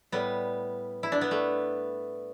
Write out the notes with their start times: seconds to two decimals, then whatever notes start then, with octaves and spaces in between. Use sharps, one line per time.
0.12 A2 G3 B3
1.03 E4
1.12 D4
1.21 B3
1.31 A3